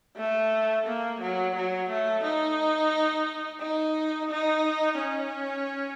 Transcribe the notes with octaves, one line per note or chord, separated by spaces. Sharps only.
A3
A#3
F#3
F#3
A3
D#4
D#4
D#4
C#4